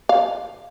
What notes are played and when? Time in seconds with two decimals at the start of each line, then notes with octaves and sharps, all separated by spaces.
0.09 F5